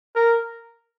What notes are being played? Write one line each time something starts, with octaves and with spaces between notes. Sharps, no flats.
A#4